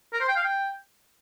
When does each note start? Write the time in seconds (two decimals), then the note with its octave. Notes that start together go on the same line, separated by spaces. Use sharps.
0.13 A#4
0.20 C5
0.28 G5
0.36 F5
0.44 G5